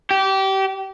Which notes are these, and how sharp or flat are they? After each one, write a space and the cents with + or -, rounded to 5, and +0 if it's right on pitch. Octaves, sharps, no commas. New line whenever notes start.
G4 -25